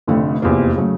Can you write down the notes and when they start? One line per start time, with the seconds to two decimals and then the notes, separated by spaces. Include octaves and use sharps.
0.07 F1 F2 D3 F3 A3
0.42 F1 E2 C3 F3 A#3
0.76 C#3 F#3 A3